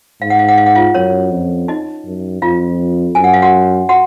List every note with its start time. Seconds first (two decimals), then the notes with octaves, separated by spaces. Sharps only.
0.21 G#2 F5
0.30 F#5
0.39 F5
0.48 F#5
0.58 F5
0.66 F#5
0.75 F4 F5
0.94 F#2 C#4 C#5
1.31 F2
1.68 D#4 D#5
2.05 F#2
2.42 F2 F4 F5
3.15 F#2 G#5
3.24 F#5
3.34 F5
3.42 F#4 F#5
3.89 F#4 F#5